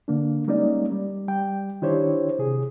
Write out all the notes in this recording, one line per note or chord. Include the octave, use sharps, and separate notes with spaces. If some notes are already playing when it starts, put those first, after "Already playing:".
D3 A#3 D4
G3 G#3 A#3 C#4 D#4 D5
G3
G3 G5
D#3 D4 E4 G4 C5 C#5
C3 G#4